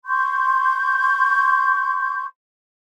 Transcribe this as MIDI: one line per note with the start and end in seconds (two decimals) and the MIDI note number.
0.05 2.24 84
0.05 2.24 85
0.05 2.24 91